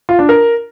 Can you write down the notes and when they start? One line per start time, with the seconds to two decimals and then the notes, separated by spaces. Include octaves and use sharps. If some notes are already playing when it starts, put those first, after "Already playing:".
0.09 F4
0.19 D4
0.29 A#4